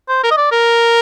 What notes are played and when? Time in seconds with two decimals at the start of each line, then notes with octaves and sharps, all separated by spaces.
0.09 C5
0.23 A#4
0.31 D#5
0.37 D5
0.52 A#4